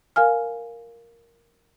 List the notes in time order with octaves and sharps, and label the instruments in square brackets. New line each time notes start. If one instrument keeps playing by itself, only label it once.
[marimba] A#4 F5 G#5 F6